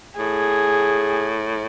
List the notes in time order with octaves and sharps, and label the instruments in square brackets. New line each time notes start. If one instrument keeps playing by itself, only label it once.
[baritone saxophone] A2 [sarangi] G#4